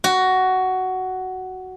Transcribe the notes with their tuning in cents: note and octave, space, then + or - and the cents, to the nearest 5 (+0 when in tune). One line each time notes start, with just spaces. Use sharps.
F#4 +10